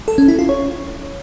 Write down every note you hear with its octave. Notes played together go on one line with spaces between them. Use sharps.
A4
C#4
E4
F4
C#5